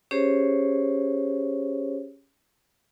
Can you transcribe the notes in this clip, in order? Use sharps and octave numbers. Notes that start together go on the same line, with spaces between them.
C#4 G4 G#4 C5 C#5